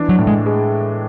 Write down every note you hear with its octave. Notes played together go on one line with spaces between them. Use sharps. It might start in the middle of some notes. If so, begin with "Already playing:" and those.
Already playing: E3 D4
F#3
A2
G#3
G#3